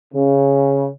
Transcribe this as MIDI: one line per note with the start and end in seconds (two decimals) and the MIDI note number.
0.14 0.88 49